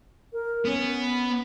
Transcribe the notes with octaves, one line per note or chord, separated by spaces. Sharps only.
A#4
B3 C#4